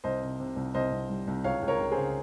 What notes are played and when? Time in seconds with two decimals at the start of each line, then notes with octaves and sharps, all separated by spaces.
0.04 C2 C5 D#5
0.22 C3
0.39 C3
0.56 C2
0.75 C2 C5 D#5
0.92 C2
1.09 G3
1.27 C2
1.44 C#2 C#5 F5
1.63 C#2
1.68 A#4 C#5
1.80 C#2
1.92 G#4 C5
1.97 C#3